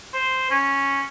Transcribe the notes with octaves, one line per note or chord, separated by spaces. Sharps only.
C5
C#4